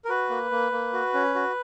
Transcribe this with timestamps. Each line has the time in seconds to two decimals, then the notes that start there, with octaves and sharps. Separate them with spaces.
0.05 A#4
0.09 F#4 B4
0.30 A#3
0.51 A#3
0.72 A#3
0.93 F#4
1.14 C#4
1.35 F#4